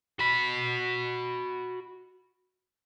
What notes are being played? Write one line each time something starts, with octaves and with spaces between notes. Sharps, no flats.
F#4 B5